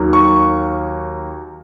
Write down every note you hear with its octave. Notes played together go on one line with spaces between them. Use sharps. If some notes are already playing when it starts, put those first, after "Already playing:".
Already playing: D#2 D#3 F#3 A#3
C#6